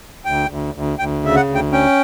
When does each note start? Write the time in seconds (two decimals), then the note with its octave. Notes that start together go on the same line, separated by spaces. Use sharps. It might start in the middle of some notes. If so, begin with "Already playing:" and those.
0.25 D2 G5
0.50 D2
0.74 D2
0.99 D2 G5
1.23 C#3 E5
1.36 F#5
1.48 D2
1.55 G5
1.72 C#4 G5